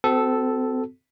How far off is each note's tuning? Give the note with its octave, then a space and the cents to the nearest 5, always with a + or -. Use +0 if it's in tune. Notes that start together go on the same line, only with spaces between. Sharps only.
C4 -35 F#4 +0 A4 -5